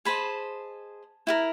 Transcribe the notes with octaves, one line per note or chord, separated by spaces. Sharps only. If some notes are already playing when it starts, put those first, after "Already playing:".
G#4 C5 D#5 A5 B5
E4 G4 A#4